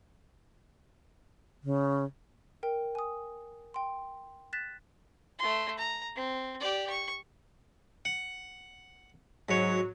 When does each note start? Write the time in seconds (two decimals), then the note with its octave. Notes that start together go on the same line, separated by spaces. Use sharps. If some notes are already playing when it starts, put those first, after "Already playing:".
1.63 C#3
2.63 A#4 G5
2.95 G#5 D#6
3.74 G5 C6
4.53 F#6 A6 B6 E7
5.39 A3 C6
5.78 A#5
6.16 C4
6.60 G4 D5
6.90 C#6
8.05 F#5
9.49 G#2 F#3 C#5